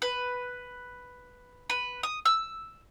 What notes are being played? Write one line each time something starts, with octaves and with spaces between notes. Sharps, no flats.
B4
B4
D#6
E6